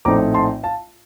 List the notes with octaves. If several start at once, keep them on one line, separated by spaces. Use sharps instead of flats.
A#1 A2 A3 C4 D#4 A#5 D6
A5 C6
F5 A5